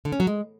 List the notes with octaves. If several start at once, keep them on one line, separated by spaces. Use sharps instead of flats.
D3
C#4
F#3
G#3